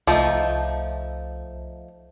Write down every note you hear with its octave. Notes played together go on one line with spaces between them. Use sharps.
C2 F3 A3 D#4